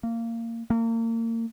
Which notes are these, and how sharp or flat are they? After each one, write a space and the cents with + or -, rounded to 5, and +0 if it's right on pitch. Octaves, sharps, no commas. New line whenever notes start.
A#3 -20
A#3 -35